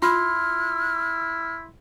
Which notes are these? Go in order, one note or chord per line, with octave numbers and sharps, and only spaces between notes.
E4 F4 C6 F6